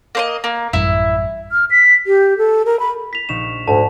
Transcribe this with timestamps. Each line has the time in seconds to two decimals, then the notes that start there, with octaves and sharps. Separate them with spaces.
0.15 A#3 C5 D#5
0.44 A#3
0.73 A1 F#2 G3 E4
1.52 F6
1.71 B6
2.07 G4
2.38 A4
2.66 A#4
2.80 B5
3.13 B6 F7
3.29 A#1 D#4 C#6 E7
3.68 D2 G#2 A5